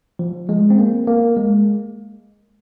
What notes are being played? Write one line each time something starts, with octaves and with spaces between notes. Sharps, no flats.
F3
G#3
C4
A#3
A#3
G#3